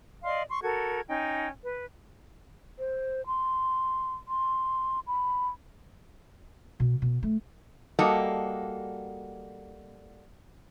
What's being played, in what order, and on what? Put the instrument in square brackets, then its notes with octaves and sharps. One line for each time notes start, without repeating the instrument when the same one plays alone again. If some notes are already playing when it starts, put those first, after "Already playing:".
[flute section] D5 D#5 F5 C6
C6 C#6
F#4 A4 A#4 G#6
C#4 D#4 G5
B4
[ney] C5
C6
C6
B5
[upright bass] B2
B2
A3
[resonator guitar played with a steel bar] G3 A#3 F#4 A4 D#5